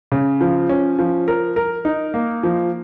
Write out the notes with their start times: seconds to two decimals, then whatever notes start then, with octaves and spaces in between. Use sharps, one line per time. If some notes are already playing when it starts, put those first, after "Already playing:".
0.12 C#3
0.41 F3
0.69 C#4
0.99 F3
1.28 A#4
1.56 A#4
1.85 D#4
2.14 A#3
2.43 F3